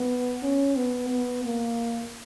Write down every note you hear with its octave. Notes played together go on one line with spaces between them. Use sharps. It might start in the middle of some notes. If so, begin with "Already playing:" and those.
Already playing: B3
C#4
B3
B3
A#3